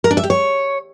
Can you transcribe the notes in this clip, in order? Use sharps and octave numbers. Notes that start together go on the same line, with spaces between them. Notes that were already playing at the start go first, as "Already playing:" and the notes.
A#4
D4
E5
G4
C#5